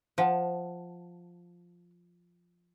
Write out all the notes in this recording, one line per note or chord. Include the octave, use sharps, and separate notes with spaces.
F3 F5 F#5 A5